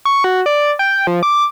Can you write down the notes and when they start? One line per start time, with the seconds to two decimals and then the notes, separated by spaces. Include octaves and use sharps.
0.05 C#6
0.24 F#4
0.46 D5
0.79 G5
1.07 F3
1.23 D6